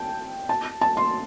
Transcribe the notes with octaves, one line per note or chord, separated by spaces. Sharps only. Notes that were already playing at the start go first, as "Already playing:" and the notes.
Already playing: G5 A5
A5
A5
C6